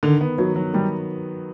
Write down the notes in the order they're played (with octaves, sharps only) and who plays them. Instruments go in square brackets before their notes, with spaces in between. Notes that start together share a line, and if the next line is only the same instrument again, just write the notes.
[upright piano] D3 [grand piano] D#3
[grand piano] B3
[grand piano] D#3 [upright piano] F#3
[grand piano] F#3
[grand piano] D#3 [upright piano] G3